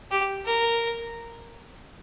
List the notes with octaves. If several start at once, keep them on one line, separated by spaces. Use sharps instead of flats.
G4
A#4